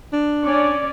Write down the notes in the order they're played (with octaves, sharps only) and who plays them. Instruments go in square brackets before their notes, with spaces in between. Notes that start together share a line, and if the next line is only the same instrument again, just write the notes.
[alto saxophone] D4
[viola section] C#4 D5